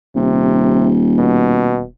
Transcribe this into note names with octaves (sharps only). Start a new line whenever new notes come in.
D#1 C3
B2